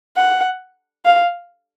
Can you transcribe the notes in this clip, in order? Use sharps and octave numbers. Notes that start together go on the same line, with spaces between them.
F#5
F5